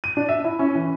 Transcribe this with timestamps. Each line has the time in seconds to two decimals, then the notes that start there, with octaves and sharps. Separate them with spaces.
0.04 D#7
0.17 D4
0.29 E5
0.45 E4
0.59 C#4
0.75 E3